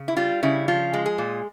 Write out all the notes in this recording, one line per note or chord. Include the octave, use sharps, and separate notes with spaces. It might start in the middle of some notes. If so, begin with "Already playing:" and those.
Already playing: C#3
E4
G3 F4
C#3 E4
F3 F4
G#3
G#4
A#2